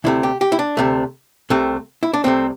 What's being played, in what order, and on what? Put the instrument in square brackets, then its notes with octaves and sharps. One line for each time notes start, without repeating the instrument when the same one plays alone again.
[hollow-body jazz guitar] D2 C3 A3 E4
G4
G4
E4
D4
D2 C3 A3
C2 C3 A3
E4
D4
C2 C3 A3 C4